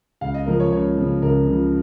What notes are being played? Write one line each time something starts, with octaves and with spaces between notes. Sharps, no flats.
C#2 F5
D#5
C#3 F3 A#4
C#5
C#2 C#5
C#3 F3
C#2 A#4
C#3 F3